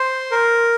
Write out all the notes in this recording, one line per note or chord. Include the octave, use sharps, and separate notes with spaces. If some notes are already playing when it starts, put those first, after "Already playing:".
Already playing: C5
A#4